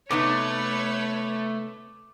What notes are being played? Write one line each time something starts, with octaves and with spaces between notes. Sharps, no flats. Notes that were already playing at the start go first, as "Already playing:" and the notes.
C3 A3 B3 D#4 B4 C#5 D6